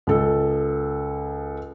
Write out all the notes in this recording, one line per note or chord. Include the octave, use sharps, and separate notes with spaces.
C#2 A4